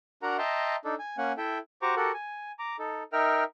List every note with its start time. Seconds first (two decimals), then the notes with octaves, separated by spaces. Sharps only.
0.23 D4 F#4 A#4 F#5 A#5
0.38 D#5 E5 G5 A5 A#5 C6
0.85 D4 D#4 A4
0.99 G#5
1.18 A#3 C#4 F#5 G#5
1.38 E4 A4 E5 G5
1.82 F#4 G4 C5 A#5 C#6 D6
1.96 F#4 G4 A4 A#4 F#5
2.14 G#5
2.59 A#5 D6
2.79 D#4 A4
3.13 D#4 A#4 E5 G5 F6